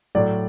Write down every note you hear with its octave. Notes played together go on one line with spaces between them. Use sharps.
A2 F#3 D5